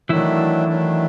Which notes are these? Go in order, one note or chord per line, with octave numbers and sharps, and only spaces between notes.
D#3 E3 F#3 A3 D4 E4
D#3 F#3 A3 D4